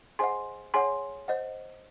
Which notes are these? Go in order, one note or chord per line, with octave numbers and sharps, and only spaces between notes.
G#4 C5 D#5 F#5 G#5 C6
G#4 C#5 F#5 G#5 C6
C5 D#5 F#5